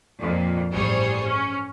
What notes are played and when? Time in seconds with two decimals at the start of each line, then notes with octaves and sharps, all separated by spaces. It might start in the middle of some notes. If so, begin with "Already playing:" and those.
0.20 F2 A#2
0.71 A1 G2 G3 G#4 C5 C#5
1.24 C#4